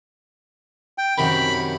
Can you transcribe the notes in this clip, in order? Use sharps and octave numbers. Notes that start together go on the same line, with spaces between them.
G5
F#2 C3 D#3 B5